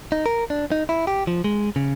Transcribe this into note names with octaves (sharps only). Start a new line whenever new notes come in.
D#4
A#4
D4
D#4
E4
G4
F3
G#3
C#3